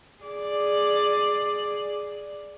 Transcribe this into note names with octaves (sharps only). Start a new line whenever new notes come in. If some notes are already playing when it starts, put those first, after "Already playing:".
G#4 D5